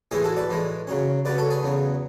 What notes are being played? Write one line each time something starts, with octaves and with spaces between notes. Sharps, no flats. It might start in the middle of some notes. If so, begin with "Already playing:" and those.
A2 E3 G#3 E4 G#4
F#4 A4
B4 D5
A2 E3 G#3
C#3 F#3 C#4
C#3 F#3 C#4 B4 D5
A4 C#5
G#4 B4
E2 C#3 F#3